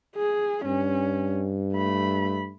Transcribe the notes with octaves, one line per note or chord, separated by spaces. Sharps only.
G#4
G2 C#4
A3 B5